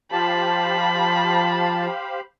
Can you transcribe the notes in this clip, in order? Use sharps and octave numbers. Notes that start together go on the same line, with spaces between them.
F3 G4 C5 F5 A5 B5